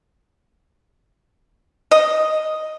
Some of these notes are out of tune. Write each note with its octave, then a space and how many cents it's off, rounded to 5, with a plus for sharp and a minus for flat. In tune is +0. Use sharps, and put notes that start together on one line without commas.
D#5 +0